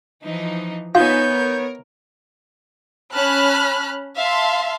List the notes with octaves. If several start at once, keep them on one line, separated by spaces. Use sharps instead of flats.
E3 F3 D#4
B3 D#4 F4 C#5 E5 G#5 G6
A#4
C#4 A5 B5 F6 F#6
E5 F5 A5 C6